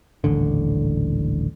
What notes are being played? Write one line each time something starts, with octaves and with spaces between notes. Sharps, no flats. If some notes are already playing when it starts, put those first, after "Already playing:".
D#1 A1 D3